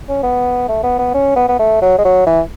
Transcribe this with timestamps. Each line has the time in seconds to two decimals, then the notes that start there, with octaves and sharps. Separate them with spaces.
0.09 C#4
0.23 B3
0.69 A3
0.83 B3
0.99 B3
1.14 C#4
1.36 B3
1.49 B3
1.59 A3
1.82 F#3
1.98 G#3
2.05 F#3
2.27 E3